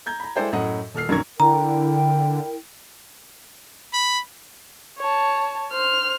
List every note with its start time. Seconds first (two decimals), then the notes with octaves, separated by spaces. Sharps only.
0.06 A#5 G6 G#6
0.20 A#5 B5
0.36 G#3 E4 A4 C5 D5 G5
0.52 F#2 A2 D#5 F#5
0.94 D#1 A4 F6 C7
1.09 A#1 F#2 D#3 A#4 C#6 G#6
1.40 D3 E4 A#4 G5 A#5
3.93 B5
4.98 C#5 A5
5.72 C5 F6